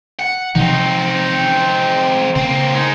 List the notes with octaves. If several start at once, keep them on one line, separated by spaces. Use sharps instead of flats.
F#5
C3 E3 F3 C4 D#4
C#3 A#3 C4
G#3 D#4